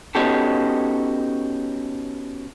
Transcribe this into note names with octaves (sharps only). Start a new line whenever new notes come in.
B3 C#4 D#4 F#4 G4 A4